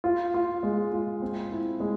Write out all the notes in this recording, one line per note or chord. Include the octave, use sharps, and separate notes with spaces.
F4
F4
G#3
F4
C4
E4
G#3